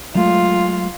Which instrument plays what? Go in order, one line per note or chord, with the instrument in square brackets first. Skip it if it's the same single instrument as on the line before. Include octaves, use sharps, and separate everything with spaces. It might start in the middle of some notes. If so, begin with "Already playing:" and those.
[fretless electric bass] F#3 G#3 A3 [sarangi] F4